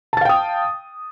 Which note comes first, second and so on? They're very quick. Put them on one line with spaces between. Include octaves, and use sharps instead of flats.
A5 A6 F5 G5 D#6